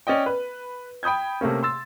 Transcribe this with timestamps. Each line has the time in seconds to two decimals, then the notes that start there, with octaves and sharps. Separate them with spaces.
0.07 C#4 D5 D#5 G5
0.26 B4
1.03 G5 B5 D#6 G6 G#6
1.41 C3 A3 A#3 C#4
1.63 C6 E6 A6